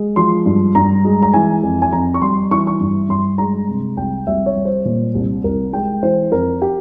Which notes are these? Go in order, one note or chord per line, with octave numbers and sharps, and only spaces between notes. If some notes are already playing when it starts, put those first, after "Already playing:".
Already playing: G#3
F3 C6
G2
G2 A#5
G#3
A#5
E3 G#5
F2
G#5
F2 A#5
C#6
G3 C6
E3 C#6
C#6
G2
G2 C6
G#3 A#5
C3
C2 G5
C2 E5
C#5
G3
C5
A#2
C2
C2 A#4
G#3 G5
E3 C5
F2 A#4
G4